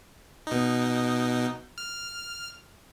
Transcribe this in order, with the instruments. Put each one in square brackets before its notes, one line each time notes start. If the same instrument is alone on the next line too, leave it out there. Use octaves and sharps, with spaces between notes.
[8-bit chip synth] B2 D#4
F6